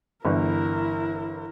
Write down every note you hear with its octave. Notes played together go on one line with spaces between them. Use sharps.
G1 D3 E3 E4 A#4